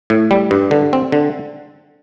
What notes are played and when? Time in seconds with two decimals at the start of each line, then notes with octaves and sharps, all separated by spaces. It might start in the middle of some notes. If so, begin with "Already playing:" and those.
0.10 A2
0.31 G3
0.51 G2
0.71 D3
0.93 C4
1.12 D3